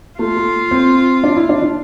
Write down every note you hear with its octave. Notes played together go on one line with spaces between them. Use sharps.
A3 F4
A3
C4
D4
E4
D4
D4